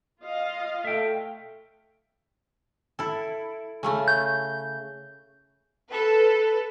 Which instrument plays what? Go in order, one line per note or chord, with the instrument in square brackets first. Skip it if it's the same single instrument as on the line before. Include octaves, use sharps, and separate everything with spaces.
[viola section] F4 D#5 F5
[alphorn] A3 [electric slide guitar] E5 G5
[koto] E4 A4
C#3 A3 C#4
[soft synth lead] G6
[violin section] A4 B4